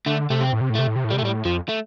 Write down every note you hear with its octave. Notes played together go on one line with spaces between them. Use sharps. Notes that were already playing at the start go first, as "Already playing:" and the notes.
D3 A3
C3 A3
C4
A2
C3
A2
C3 A3
A2
C3
A2
C3 G3
A3
A2 G3
F2 F3
A3